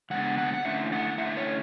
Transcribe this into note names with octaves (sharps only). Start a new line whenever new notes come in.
C#3 G#3 B3 D4 F#5
F#5
F#5
D3 A3 C#4 E4 E5
F#5
D3 A3 C#4 E4 E5
C#5